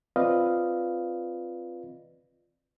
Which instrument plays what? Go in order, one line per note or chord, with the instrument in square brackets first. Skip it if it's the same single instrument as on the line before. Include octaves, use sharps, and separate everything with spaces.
[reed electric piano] C4 F4 B4 D5 D#5 F5